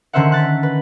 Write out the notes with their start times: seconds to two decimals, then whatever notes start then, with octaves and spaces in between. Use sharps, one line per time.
0.13 D3 D#3 C#4 C5 E5 F#5
0.32 F#6 A6 B6
0.63 B4